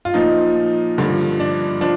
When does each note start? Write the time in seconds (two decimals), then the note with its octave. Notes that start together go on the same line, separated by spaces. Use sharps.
0.05 F4
0.14 A#2 F3 D#4
0.98 G2 D3 F3
1.40 D4
1.81 F3 D4